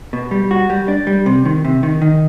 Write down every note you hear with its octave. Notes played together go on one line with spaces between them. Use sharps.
B2
G3
F#4
G3
D4
G3
C3
D#3
C3
D#3
D#3